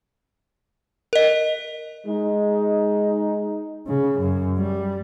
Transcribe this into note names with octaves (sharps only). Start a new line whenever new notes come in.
A#4 D#5
G#3 D#4
C#3
F#2
G3